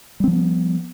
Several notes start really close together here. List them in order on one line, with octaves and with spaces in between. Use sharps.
G3 C4 F3 B3